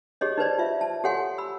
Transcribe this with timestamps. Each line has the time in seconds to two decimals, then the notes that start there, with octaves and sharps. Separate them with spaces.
0.21 G4 G#4 C#5 D#5
0.38 D#4 B4 C5 D5
0.58 F4 E5
0.81 A5
1.04 G4 A4 C#5 F#5 G#5 C6
1.38 B5 E6